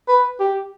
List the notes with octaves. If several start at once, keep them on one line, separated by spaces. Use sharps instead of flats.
B4
G4